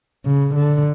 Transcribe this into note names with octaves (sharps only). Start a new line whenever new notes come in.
C#3
D3